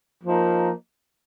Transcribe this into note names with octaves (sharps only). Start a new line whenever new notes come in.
F3 A#3 D#4